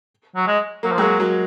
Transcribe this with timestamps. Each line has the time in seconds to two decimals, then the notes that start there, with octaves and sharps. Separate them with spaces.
0.36 F#3
0.47 G#3
0.83 F#3 A#3
0.92 F3
0.98 F#3 G#3 A#3
1.20 F#3